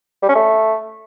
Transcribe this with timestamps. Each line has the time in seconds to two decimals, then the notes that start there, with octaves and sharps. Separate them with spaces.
0.23 G3
0.29 C#4
0.35 A3